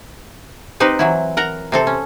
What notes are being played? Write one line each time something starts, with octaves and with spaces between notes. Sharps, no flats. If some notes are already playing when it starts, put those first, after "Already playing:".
C4 D#4 G4 B4 C5
E3 F#3 E4
A#4 F#5 A#5
C3 C4 A4
C#4